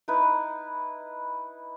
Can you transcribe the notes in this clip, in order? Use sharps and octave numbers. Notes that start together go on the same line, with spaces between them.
D#4 E4 B4